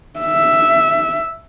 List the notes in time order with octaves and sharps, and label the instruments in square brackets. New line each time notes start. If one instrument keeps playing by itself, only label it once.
[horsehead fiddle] E5